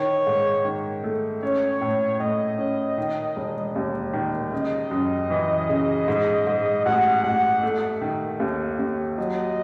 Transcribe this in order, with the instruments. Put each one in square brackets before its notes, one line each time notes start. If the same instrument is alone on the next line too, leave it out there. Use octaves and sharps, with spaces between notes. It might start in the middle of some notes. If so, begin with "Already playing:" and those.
Already playing: [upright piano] D#3 [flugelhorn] C#5
[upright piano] G#2
D#3
A3
[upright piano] C#4 [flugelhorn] C#5
[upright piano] A2
[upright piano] A2 [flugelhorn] D#5
[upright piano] C#4
D#3
E1
D#2
D#3
[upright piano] C#3 [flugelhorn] D#5
[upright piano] F#2
E3
C#3
G#2
G#2
[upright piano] A1 [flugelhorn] F#5
[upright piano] A1 [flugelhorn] F#5
[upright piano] A3
D#3
D#2
D#2
[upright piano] F#3 [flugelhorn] D#5